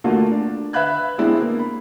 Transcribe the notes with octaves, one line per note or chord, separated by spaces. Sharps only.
A3 A#3 D4 F4 F#4
D4
B4 E5 F5 B5 F#6 G#6
G#3 B3 C4 D4 E4
A#3
B5